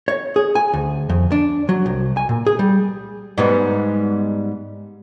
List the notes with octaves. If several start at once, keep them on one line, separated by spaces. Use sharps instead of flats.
C#5
G#4
G#5
D2
F2
D4
F#3
C2
G#5
A#2
G#4
G3
G#2 G3 B3